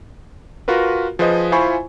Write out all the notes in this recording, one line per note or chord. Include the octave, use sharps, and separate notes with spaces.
F4 F#4 A#4 B4
F3 G#4 B4 C5 D#5
E4 F4 C5 G#5 B5 C#6